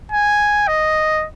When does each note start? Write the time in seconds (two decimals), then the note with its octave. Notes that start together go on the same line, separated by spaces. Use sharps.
0.11 G#5
0.67 D#5